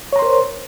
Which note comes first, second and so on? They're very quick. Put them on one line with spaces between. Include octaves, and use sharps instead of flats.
C#5 A#5 C6 A#4 C5